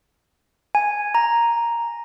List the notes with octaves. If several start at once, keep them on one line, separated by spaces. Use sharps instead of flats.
G#5
A#5